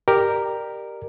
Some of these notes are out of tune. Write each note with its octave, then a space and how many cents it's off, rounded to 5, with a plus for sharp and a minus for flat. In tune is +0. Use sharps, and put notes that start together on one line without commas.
G4 +0 A#4 +0 D5 +35